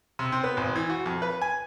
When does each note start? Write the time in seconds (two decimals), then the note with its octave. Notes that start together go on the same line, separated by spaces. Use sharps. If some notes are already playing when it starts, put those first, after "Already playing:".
0.19 C3
0.32 C4
0.44 B3
0.57 G#1
0.76 E3
0.90 F#4
1.06 F2
1.22 B4
1.42 G#5